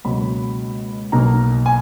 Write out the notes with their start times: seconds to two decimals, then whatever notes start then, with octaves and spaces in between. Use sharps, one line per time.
0.04 C#2 B2 F#3 A#3 B5
1.12 B1 B2 A#3 A#5
1.66 G#5